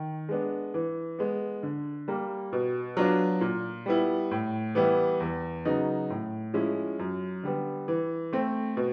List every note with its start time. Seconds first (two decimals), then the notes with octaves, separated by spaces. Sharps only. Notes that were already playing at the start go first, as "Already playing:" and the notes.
Already playing: D#3
0.29 G#3 B3 D4
0.74 E3
1.19 G#3 B3
1.63 D3
2.08 G3 A#3
2.53 B2
2.97 F#3 B3 D4 F4
3.41 A#2
3.86 G3 B3 E4
4.31 A2
4.75 E3 G3 B3 E4
5.20 E2
5.65 C#3 F#3 B3 D#4
6.10 A2
6.54 F3 G#3 C#4 E4
6.99 F#2
7.43 D3 G3 B3
7.88 E3
8.33 A3 C4
8.77 B2